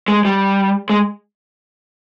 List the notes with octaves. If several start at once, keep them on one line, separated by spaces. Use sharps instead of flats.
G#3
G3
G#3